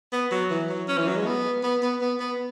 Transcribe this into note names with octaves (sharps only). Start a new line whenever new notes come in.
B3
F#3
E3
F#3
C#4
E3
F#3
G#3
B3
B3
B3
B3
B3